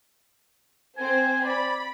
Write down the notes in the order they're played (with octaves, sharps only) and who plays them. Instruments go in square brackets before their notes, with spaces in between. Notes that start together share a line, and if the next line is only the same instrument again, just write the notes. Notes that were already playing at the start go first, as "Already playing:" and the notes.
[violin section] C4 C5 [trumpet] G#5
[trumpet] D5 [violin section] B5